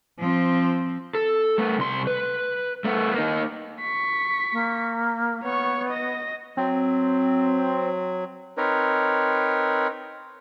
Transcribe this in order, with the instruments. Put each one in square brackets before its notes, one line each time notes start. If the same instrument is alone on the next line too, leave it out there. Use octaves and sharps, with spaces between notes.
[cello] F3 C4
[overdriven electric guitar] A4
A3 B3
C2 C6
B4
A3 B3
A#3 D#4
[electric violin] C#6 B6
[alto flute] A#3
[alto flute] B3 [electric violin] C#5 C#6
[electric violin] D#5 A#6
[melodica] F#3 [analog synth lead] C4
[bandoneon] C4 D#4 A#4 B4 C#5